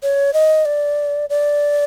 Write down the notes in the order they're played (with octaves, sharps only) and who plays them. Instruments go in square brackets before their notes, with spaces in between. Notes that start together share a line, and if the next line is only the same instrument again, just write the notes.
[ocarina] C#5
D#5
D5
D5